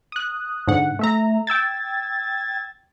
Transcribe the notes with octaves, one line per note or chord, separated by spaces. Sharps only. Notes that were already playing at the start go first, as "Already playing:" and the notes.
D#6 F#6
G#2 D3 F#5
A3 E5 A#5
G5 E6 G#6 A6